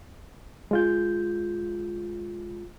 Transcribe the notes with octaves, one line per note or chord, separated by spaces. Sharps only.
G#3 F4 G6